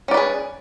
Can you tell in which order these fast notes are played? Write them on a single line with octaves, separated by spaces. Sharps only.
C#4 D5 B4 G#4